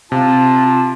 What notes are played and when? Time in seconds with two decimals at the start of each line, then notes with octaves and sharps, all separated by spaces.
0.12 C3 F4 A5